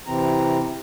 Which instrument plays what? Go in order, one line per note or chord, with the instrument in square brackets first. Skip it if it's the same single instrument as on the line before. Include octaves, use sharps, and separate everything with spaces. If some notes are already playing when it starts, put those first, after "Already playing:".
[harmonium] C3 E3 C4 A#5